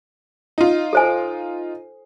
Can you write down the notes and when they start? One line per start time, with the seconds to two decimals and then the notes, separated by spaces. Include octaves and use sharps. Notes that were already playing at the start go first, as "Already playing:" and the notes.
0.58 D#4 F4
0.93 A4 C5 G#5